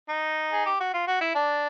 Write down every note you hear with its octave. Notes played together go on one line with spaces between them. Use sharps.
D#4
G#4
G4
F#4
F4
F#4
E4
D4